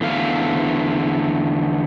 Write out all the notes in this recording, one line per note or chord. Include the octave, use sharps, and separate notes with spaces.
E2 D3 A3 F5